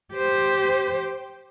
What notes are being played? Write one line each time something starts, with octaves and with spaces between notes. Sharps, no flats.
G4 C5